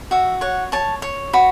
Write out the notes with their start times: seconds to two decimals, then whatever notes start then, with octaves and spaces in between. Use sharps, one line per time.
0.11 F#4 E5
0.41 C#5 F#5
0.72 C#5 A5
1.02 C#5
1.33 F#4 B5